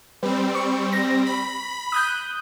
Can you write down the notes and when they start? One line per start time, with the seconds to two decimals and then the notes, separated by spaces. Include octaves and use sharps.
0.23 G3 C4 B4
0.55 C#6
0.92 A#6
1.26 B5
1.92 D#6 F#6 G6